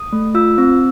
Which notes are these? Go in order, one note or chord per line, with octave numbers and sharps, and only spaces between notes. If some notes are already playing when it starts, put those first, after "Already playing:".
Already playing: D#6
A3
F4 E6
C4